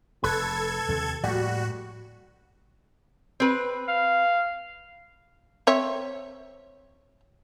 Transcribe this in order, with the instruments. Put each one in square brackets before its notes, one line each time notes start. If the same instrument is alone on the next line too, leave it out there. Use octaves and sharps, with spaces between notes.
[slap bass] F1 [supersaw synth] A4 G#6 [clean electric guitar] B4
[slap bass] D#2 C3 F3
[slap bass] A2 F3 A#3 [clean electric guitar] G3 [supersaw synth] F#4
[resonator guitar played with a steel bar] C4 B4
[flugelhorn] F5
[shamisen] C4 C#5 E5